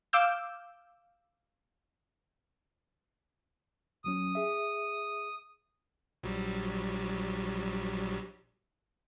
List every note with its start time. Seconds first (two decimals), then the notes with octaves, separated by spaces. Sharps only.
0.13 F5 D6 E6 G6
4.04 D#2 F#3 C#4 D#6
4.35 G#4 E5
6.23 A#1 F#3 G3